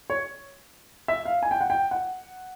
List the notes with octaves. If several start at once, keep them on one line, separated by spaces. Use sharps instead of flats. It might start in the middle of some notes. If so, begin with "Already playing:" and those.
C#5
E5
F5
G#5
G5
F#5
G5
F#5